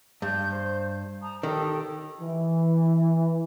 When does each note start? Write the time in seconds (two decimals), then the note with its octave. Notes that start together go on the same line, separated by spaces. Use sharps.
0.22 G2 G6
0.52 C5
1.21 A5 A#5 D#6
1.43 D#3 G4 A4 G5
1.82 C#5
2.21 E3